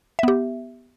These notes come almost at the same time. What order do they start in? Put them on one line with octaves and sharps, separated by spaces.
E5 B3 G4